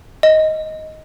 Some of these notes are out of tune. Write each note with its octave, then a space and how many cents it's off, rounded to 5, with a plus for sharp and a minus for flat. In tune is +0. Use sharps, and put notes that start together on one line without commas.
D#5 +10